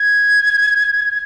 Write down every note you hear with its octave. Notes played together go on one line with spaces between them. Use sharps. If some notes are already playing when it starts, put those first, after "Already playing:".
Already playing: G#6